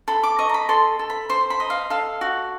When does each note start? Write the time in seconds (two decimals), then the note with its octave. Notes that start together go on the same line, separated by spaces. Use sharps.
0.08 A4 B5
0.23 D6
0.39 D#5 C#6
0.49 A#5
0.54 B5
0.69 A4 C6
0.99 A4
1.10 B5
1.29 C5 C6
1.50 B5
1.60 D#5
1.70 F5
1.90 A4 F5
2.21 F#4